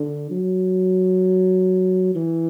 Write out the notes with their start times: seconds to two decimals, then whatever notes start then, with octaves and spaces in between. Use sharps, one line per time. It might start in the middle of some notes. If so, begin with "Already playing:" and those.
Already playing: D3
0.31 F#3
2.15 E3